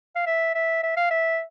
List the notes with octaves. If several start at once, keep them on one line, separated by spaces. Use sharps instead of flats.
F5
E5
E5
E5
F5
E5